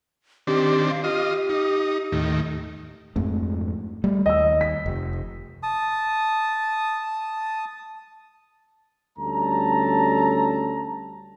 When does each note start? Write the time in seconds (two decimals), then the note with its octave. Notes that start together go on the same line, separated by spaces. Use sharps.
0.47 D#3 C4 D4 G4
0.90 F5
1.04 F4 G4 D#5
1.49 D#4
2.12 D#2 A2 D#3
3.16 F2 G#2 A3
4.04 G3 A3
4.26 D#2 D#5 E6
4.61 B6
4.86 F1
5.63 A5 D#6
9.18 D2 G3 C#4 A4 A5 A#5